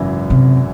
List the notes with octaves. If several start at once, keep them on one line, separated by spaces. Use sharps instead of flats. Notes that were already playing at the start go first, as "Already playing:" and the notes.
Already playing: G#1 F#2 C#3 E3
C3